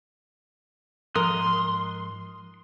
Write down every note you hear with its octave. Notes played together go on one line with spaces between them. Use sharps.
G#2 F3 A#4 C6 D#6 F#6